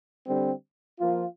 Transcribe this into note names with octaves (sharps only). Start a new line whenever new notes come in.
D3 G3 C4
F3 A#3 F4